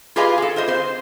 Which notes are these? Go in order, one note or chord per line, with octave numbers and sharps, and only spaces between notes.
F4 G4 G#4 B4 D#5 F5
G#4 A4
F4 C5 D#5
C4 C5